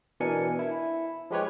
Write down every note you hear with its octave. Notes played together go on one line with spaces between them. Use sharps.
B2 E3 D4 A#4 G#5 C#7
E4
F3 G#3 G4 B4 C#5